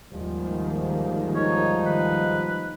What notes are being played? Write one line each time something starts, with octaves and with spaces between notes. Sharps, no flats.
D#2 G#2 D#3 F3 G3
D#4 C#5
B4